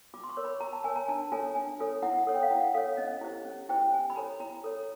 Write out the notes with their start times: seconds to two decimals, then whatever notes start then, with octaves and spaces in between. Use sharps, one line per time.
0.14 F4 D6
0.24 C6
0.29 C#6
0.37 A#4 C#5
0.45 B5
0.60 F4 A#5
0.73 A5
0.84 A#4 C#5 G#5
0.96 A#5
1.08 D4 A5
1.32 F4 A4 C#5 G#5
1.55 D4 G#5
1.80 F4 A4 C#5
2.02 E4 F#5
2.18 F#5
2.27 A4 C#5
2.35 G5
2.43 F5
2.50 E4 F#5
2.74 A4 C#5 F5
2.97 C#4 D#5
3.21 E4 G4 C5
3.45 C#4
3.69 E4 G4 C5 G5
3.92 E4 G#5
4.10 B5
4.16 A4 C#5 A#5
4.40 E4 A#5
4.64 A4 C#5